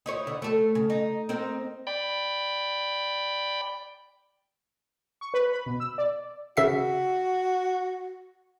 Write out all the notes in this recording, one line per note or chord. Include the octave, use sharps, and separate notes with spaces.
D#4 E4 C#5
D3
A3 A4
C#3
D#4
C4 D#4 A#4
D5 G5 B5
C#6
B4
B5
B2
E6
D5
C#3 F#4 E5 C7